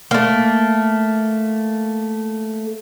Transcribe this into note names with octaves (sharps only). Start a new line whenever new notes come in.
A3 A#3